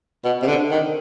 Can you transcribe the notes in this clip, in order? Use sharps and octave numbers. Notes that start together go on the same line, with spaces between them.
B2
C3
D3
D#3